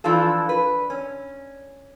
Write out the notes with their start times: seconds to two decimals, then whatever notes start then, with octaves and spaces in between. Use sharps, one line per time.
0.04 E3 F3 D4 F4 A4
0.49 B4
0.90 C#4